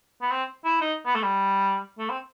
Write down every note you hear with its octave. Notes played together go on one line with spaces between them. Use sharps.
B3
C4
E4
D#4
B3
A3
G3
A3
C4